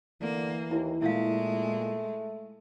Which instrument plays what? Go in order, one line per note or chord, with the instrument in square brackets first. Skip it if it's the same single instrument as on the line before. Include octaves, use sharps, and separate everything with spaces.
[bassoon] D3 [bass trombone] E3 [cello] A#3
[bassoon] D#2 [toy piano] E4
[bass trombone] A#2 [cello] G#3 [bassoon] A3 [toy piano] E4 F5